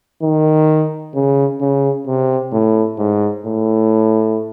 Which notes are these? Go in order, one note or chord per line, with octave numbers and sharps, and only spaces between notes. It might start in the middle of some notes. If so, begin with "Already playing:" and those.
D#3
C#3
C#3
C3
A2
G#2
A2